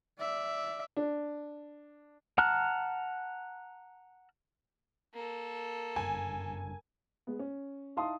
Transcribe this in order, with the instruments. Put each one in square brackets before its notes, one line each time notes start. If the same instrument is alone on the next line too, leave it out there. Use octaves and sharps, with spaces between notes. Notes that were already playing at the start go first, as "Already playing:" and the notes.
[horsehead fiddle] D5 E5
[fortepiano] D4
[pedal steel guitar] F#5 A5 A#5 F6 F#6
[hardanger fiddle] A#3 A4
[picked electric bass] F#1 G2 [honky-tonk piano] G#5
[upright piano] G#3 B3
C#4
D#4 E4 F5 A5 C6 D#6